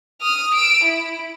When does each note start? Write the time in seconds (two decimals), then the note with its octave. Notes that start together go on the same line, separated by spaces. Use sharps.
0.21 D#6 F6
0.54 E6 D7
0.84 E4